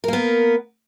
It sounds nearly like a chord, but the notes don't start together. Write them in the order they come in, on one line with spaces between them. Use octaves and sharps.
A#4 A#3 B3